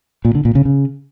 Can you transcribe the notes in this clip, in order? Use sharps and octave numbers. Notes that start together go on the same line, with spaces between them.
A#2
D3
A#2
C#3
C#3